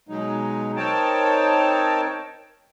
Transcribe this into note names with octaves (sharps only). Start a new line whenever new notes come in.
B2 F#3 G#3 D#4
C4 D#4 A#4 C#5 G5 A5